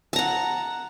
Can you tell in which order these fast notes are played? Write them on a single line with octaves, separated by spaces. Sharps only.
A5 A#5 F#5